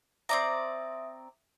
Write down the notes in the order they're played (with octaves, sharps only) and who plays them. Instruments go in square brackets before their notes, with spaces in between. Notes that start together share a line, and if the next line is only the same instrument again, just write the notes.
[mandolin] C4 D5 A#5 [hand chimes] E5 D#6